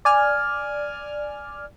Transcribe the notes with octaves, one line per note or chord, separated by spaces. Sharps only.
D5 G#5 F6